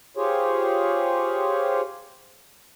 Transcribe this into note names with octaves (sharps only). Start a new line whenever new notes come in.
F4 G4 G#4 C5 C#5